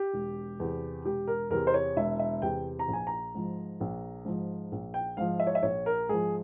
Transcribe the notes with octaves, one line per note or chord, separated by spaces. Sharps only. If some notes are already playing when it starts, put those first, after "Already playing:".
Already playing: G4
E1
E2 C3
E1 G4
A#4
E2 C3 A#4
C5
C#5
E1 E5
E5
E2 C3 G5
A#5
A#1
G#5
A#5
G#2 F3
A#1
G#2 F3
A#1
G5
G#2 F3 F5
E5
C#5
E5
A#1 C#5
A#4
G#2 F3 G#4